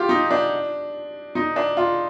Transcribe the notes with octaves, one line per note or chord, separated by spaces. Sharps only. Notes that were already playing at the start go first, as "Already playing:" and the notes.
Already playing: F4 G4
D#4
D4
D#4
D4
F4